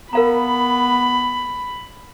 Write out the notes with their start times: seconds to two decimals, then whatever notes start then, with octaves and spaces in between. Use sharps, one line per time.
0.13 B3 A#4 F5 A#5 B5